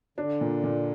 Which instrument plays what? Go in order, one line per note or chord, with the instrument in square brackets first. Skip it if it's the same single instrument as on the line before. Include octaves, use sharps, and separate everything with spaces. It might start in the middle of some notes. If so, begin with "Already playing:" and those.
[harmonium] D3 [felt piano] D4
[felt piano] A#2
A#2